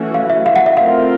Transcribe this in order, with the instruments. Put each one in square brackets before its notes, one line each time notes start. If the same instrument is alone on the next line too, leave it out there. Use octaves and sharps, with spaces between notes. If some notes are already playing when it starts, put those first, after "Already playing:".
Already playing: [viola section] E3 A3 C#4 F#4
[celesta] F5
E5
F5
F#5
E5
[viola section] A3 C4 F4 A#4 [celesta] F5